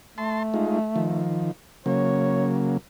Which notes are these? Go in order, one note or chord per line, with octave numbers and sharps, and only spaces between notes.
A3 A5 C6
G#3 D#4 F4
D#3 F3
C#3 F#3 A#3 C#5